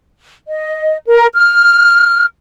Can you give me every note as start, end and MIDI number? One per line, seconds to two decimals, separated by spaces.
0.47 0.97 75
1.06 1.27 70
1.35 2.24 89